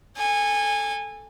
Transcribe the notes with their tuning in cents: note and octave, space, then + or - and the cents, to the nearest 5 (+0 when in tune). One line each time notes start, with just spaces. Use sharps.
A4 +0 G#5 -20